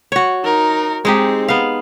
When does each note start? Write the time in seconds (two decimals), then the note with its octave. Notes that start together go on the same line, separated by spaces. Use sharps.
0.12 F#4 C#5
0.44 D#4 A#4
1.05 G#3 C4 D#4 G4
1.48 B3 F5